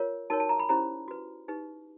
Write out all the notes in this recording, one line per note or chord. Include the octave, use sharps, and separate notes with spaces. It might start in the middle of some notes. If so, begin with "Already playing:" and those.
Already playing: F4 A#4 C#5
D#4 F#4 A#4 C#5 A5
A5
A#5
B5
C#4 E4 G4 C5 A#5
F#4 B4
D#4 G4 B4